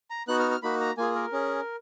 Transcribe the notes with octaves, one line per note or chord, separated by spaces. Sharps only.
A#5
B3 D#4 F#4 F#6
F6
F6
A#3 D#4 F#4 B5
A#5
A#3 F4 G#4 G#5
A#4
C#4 G#4